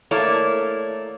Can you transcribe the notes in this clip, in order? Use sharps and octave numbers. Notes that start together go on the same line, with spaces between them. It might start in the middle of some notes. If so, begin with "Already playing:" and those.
A3 A#3 E4 C#5 D5